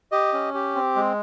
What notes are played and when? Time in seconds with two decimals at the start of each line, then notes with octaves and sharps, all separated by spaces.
0.12 G4 D#5
0.33 C#4
0.54 G4
0.75 C4
0.96 G#3